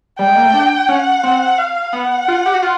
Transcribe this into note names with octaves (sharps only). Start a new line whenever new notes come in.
G3 G5
G#3
A#3
A3
D4
C#4 F#5
C4
F5
B3 F#5
F4
G4
F#4
F4